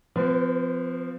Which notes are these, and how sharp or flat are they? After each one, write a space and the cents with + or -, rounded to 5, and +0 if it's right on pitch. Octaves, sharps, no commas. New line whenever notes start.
F3 +0 C4 -45 B4 +0